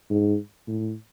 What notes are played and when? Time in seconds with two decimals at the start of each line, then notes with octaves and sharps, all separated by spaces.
0.10 G#2
0.67 A2